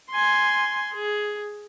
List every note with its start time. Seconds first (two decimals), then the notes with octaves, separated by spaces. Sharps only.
0.11 G#5 C6
0.93 G#4